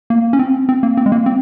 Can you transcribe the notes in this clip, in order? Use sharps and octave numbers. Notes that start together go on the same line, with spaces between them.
A#3
C#4
C4
C4
A#3
C4
G#3
A#3
C4